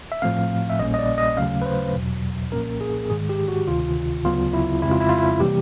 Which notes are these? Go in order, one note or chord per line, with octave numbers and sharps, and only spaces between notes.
E5
A2 F3 A3 C4 F5
E5
A#1 A#2 G3 A#3 C#4 D#5
D#5
D5
D#5
D#2 C#3 F#3 A3 C#4 F5
B4
C5
E2 B2 F#3
C2 A#2 F3 A#3 C#4 A#4
G#4
G#2 D#3 G#3 G#4
G4
F#4
D2 C3 D#3 F4
D2 C#3 F#3 B3 F4
E4
F2 C#3 F3 G#3 C4 E4
F4
E4
F4
E4
C3 E3 G3 A#3 G4